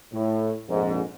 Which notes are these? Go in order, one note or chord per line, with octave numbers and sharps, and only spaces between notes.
A2
A#1 F2 G#2